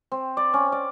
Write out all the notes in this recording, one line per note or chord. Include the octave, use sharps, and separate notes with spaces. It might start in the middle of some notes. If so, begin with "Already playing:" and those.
C4
D5
C#4
D5